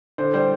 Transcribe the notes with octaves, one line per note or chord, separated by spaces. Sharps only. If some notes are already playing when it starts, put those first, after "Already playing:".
D3 C5
G3 C5